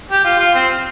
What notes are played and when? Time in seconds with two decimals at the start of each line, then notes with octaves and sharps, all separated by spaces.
0.11 G4
0.24 F4
0.39 F4
0.54 C4